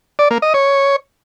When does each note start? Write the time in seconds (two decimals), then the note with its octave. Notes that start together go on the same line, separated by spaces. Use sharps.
0.19 D5
0.31 A#3
0.42 D#5
0.54 C#5